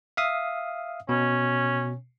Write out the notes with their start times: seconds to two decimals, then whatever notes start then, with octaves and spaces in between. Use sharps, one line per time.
0.17 E5 F5 D#6
1.09 B2 C#4